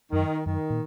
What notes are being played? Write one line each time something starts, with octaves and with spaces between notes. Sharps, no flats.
F#2 D#3
F#2 D#3
A#2